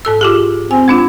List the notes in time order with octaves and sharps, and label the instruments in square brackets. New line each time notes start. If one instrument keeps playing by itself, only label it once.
[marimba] G#2 A4 E6
F4 G4 G#4
[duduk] C4 [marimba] G#5
[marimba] G#3 D4 F4